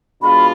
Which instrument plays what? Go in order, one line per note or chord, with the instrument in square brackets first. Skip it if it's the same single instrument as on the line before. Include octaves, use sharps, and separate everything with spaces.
[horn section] B2 G#3 D4 F4 [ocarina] B5